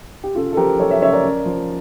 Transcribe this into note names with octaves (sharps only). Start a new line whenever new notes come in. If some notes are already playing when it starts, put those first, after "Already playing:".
G4
C#3 F4 A4
A4
F3 G4 A#4
F3 A4 C#5
C#5 E5
C#3 C#5 E5
A#4 D5
C#3
F3